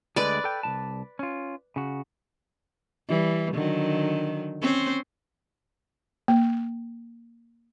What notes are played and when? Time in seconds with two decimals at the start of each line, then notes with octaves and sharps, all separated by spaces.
0.16 D2 D3 G#3 B4 D5
0.44 A4 G5
0.63 C2 G2 A5
1.19 C#4 F4
1.76 C#3 F#4
3.08 E3 G3
3.54 D3 D#3 F#3
4.61 C4 C#4 C5
6.28 A#3